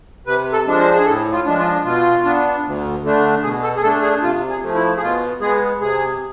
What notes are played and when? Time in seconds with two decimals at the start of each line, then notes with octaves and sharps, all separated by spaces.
0.26 C3 B4
0.53 A4
0.66 F3 G#3 D4
0.79 C5
0.95 G#4
1.05 A2 A4
1.32 F4
1.46 F3 G#3 D4
1.59 F4
1.84 B2 F4
2.25 B3 D4
2.64 D2
3.03 D3 A3 D4
3.43 B2 G#4
3.63 A4
3.76 G#4
3.82 A3 D4 A4
4.03 G#4
4.22 C3 F4
4.49 G#4
4.62 F3 A3
4.75 E4
4.97 G#4
5.01 B2 F4
5.41 G#3 B3 G#4
5.81 C3 G#4